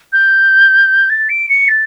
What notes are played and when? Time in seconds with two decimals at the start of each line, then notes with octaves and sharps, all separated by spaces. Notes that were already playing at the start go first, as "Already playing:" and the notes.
0.12 G6
1.09 A6
1.28 D7
1.49 C#7
1.68 A6